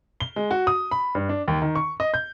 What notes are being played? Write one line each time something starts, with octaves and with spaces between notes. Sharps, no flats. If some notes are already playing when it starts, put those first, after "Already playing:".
G7
G#3
F#4
D#6
B5
G2
D4
D#2
D#3
C#6
D#5
G6